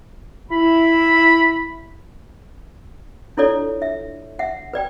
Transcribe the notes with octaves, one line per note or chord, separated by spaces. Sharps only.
E4 B5
D4 E4 F4 A4 C#5 D5
E5
E5 F#5
B4 D5 G5